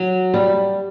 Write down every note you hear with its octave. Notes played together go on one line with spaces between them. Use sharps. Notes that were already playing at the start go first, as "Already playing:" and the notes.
Already playing: F#3
G3